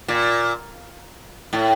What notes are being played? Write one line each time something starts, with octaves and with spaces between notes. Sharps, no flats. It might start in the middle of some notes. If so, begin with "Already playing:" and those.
A#2
A2